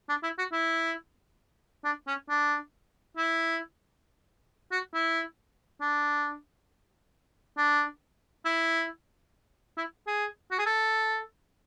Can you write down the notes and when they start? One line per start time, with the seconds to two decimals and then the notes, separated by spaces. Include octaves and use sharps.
0.09 D4
0.23 E4
0.39 F#4
0.52 E4
1.84 D4
2.07 C#4
2.29 D4
3.17 E4
4.72 F#4
4.94 E4
5.81 D4
7.57 D4
8.45 E4
9.77 E4
10.07 G#4
10.51 F#4
10.59 G#4
10.66 A4